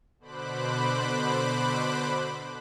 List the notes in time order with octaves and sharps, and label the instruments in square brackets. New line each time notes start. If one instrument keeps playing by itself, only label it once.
[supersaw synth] B2 D3 C5 B5 D6 F#6